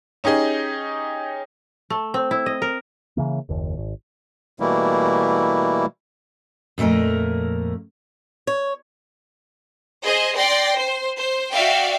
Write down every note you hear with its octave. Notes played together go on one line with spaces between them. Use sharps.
C#4 D#4 G4 G#4 D#5
A3
C4
E4
D#5
A#4
C#3 E3 A#3
F#1 D#2
G#1
B2 E3 G3 A3 A#3 E4
F2 A#2 A3 A#4 D#5
C#5
G#4 C5 D#5
D5 G5 C6 A#6
C5
C5
F#4 D5 E5 F5 G5